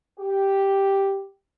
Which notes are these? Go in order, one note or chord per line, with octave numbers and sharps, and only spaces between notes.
G4